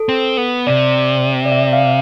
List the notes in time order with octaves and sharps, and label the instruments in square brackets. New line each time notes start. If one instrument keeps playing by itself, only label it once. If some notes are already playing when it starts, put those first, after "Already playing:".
Already playing: [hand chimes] A4
[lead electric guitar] C4
B3
[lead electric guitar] C3 [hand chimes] D5
[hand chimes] D5
E5
F5